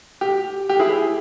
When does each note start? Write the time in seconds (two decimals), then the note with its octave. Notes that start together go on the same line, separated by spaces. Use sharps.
0.21 G4
0.69 G4
0.79 E4 G#4